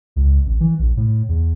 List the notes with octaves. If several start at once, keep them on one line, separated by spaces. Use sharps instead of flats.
C#2
A1
E3
A#1
A2
E2